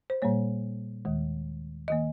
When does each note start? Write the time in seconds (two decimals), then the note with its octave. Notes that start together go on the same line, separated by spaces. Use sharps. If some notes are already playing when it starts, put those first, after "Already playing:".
0.10 C5
0.22 A#2 G3 A#3 C#5
1.05 D#2 D#3 G#3
1.88 D#3 A#3 D#5